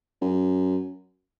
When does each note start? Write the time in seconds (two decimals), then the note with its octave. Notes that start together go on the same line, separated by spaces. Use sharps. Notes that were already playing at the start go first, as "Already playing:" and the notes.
0.21 F#2